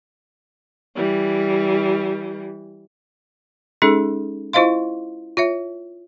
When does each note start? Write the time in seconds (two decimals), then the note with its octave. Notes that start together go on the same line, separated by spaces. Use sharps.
0.96 E3 G3
3.82 G#3 C#4 D#4 G#4 A4
4.53 E4 F4 C5 D#5 F5 C6
5.37 F4 C#5 E5